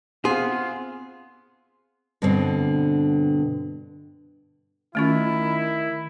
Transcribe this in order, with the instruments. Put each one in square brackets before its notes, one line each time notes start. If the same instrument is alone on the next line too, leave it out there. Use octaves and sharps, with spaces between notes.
[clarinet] B3 [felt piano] C4 F4 [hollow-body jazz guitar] G#4 [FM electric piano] C6
[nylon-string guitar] G2 B2 D3 C4
[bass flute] D#3 [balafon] A3 C#4 F4 [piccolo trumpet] E4